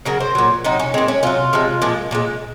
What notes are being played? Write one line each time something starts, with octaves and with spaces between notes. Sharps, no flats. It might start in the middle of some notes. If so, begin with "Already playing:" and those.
C#3 F#3 A#4
C5
A#2 F#3
C3 F#3 D#4
C#4
A#2 G#3 C4
C#4
C3 F#3 F4
C3 F3 G#3
A#2 F3 G#3
A#2 F3 G#3